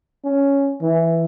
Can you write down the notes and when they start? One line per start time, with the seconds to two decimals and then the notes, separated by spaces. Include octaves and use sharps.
0.25 C#4
0.82 E3